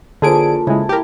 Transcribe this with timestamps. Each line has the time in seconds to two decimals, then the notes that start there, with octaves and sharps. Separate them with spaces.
0.22 D3 F3 A#3 G#4 A4 D7
0.67 C#3 G#3 E4
0.89 G4 A#4